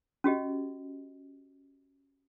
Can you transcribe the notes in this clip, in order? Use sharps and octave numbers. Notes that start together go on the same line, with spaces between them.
C#4 F#4 G4 D#5